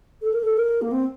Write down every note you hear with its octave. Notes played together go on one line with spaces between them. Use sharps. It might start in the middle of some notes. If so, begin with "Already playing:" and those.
A4
A#4
A4
A#4
A#3
C4